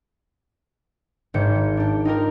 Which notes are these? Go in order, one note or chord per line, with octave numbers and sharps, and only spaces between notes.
G#1 G#2 G6 C#7
D4 G4
D#4 F4 G4 A#4